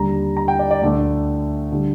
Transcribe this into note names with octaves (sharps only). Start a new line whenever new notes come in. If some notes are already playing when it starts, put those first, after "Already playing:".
Already playing: D#2 D3 G3 A#5
A#5
G5
D5
D5
D2 D3 A3
D3 G3